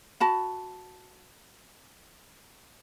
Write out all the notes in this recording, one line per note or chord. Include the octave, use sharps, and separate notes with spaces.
F#4 A5 B5